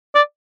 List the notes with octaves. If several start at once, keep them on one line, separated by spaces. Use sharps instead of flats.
D5